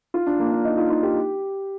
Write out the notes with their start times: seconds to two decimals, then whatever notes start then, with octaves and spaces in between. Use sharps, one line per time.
0.14 F4
0.27 D4
0.39 A#3
0.52 D4
0.65 D#4
0.78 F4
0.90 F4
1.03 G4